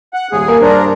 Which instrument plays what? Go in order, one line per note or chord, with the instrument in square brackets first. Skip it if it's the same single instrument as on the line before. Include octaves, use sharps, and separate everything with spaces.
[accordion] F#5
[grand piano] D#1 [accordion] G#4
[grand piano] A#3
[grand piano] G2 C5 [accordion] D4 A#4